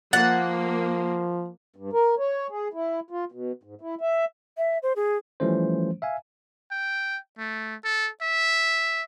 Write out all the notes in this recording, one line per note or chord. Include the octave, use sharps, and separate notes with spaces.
F3 A#3 F#5 A6
G2
A#4
C#5
G#4
E4
F4
B2
G#2
E4
E5
E5
C5
G#4
E3 F3 G3 A3 C#4 C5
E5 F5 G#5
G5
A3
A4
E5